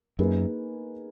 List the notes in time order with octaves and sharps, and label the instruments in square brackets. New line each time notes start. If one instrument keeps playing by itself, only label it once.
[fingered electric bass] F#2 [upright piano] A#3 D#4 G#4 B4